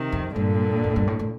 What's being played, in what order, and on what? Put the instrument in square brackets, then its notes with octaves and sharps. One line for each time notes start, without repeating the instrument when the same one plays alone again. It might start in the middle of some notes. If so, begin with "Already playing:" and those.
Already playing: [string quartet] C3 D#3
[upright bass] F2
[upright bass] G2 [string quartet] A#2 D3
[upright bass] F2
G2
A2
A2